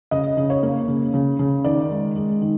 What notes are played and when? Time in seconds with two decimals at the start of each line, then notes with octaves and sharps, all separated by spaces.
0.11 C#3 D#5
0.37 C#3
0.50 C#5
0.63 A#3
0.88 C#3
1.14 C#3
1.39 C#3
1.64 D#3 D5
1.90 G#3
2.16 G#3
2.42 D#3